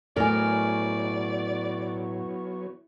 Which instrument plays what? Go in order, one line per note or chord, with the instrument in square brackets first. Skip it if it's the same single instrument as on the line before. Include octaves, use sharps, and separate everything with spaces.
[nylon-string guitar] A2 [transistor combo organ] F#3 B3 C#5 [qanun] A#4 G#5 [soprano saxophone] D5